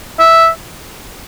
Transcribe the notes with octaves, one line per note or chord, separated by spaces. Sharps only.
E5